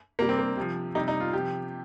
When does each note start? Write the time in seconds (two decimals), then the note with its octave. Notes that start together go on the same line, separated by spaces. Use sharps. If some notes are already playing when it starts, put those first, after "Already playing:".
0.19 C3 G3 A#3
0.29 C4
0.39 A#3
0.57 C3 F3
0.95 C3 G3 D#4
1.08 D#4
1.20 F4
1.33 C3 F3 G4